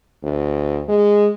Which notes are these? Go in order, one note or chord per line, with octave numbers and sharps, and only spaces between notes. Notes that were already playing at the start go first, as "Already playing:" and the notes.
D2
G#3